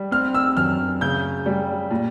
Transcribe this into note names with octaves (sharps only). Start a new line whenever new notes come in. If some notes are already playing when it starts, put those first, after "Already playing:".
Already playing: G3
C4 F6
E6
F#2 F6
C#3 G6
G3
A#2